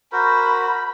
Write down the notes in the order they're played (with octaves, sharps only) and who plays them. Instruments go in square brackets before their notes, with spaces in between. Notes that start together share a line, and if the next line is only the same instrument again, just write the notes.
[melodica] F#4 A#4 C5 [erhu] B5